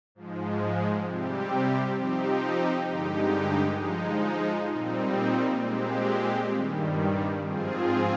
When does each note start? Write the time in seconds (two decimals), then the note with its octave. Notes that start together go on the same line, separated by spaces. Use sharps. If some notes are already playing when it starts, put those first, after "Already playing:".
0.15 G#2 F3 G#3
1.06 C3 G3 C4 G4
1.97 F3 C4 D#4 G4
2.88 G2 D3 G#3 D#4 G4
3.79 F3 G#3 D#4
4.70 A#2 G3 C4 D#4
5.60 A#2 G#3 C4 G4
6.52 G2 D#3 G3
7.43 G#2 F3 C4 F4 G#4